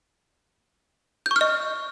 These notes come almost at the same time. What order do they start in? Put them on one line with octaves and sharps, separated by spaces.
G6 C#6 F6 D#5